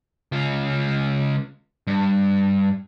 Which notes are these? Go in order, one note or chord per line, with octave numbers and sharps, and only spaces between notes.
C#2 F4
G2